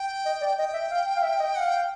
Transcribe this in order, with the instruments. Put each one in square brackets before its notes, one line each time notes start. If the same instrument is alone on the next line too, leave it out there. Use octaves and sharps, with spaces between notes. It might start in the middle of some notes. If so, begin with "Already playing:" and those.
Already playing: [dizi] G5
[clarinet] D#5
D5
[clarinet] D#5 [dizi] G5
[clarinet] E5
F5
F5
E5
D#5
[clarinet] F5 [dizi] F#5
[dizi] G5